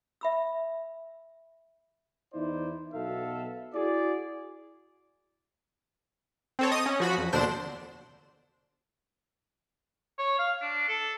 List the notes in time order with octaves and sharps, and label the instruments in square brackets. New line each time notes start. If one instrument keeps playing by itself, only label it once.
[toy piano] E5 B5 E6
[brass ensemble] E2 D#4 E4 C5 D5
B1 B2 A4 E5 F5
E4 F#4 G#4 D5
[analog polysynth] C4 A4 C#5
D#5 D#6
C#4
F3 F#4 B5
F2
D#2 B2 D3 D4 C5 E7
[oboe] C#5
F5
D4
A4